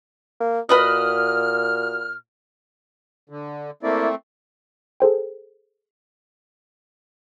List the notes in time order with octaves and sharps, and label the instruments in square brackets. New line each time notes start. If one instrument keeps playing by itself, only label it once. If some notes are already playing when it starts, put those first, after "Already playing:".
[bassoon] A#3
[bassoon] A#2 [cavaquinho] F#4 B4 D#5 [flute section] F6
[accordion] D3
[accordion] A3 C4 [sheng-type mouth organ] A#3 E4 D5
[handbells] G#4 A4 C5 G5